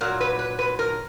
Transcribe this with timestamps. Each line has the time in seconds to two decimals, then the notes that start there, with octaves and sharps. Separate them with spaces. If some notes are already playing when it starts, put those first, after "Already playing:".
0.01 A#2 F#3 A#4
0.20 B4
0.39 B4
0.59 B4
0.79 A#4